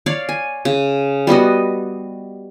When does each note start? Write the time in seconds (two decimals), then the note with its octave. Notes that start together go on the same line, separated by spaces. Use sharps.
0.06 C#5 D5 F5
0.29 G#5
0.65 C#3
1.27 G3 B3 F#4 D#5